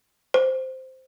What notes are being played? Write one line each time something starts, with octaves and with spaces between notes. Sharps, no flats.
C5